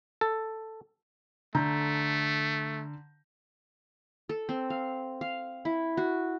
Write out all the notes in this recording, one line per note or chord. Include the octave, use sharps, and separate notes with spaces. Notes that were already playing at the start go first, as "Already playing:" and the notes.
A4
D3 A3 A#5 G6
A4
C4
F5
F5
E4
F#4